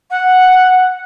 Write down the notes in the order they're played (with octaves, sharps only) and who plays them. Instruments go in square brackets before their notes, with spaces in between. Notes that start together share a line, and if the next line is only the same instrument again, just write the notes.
[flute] F#5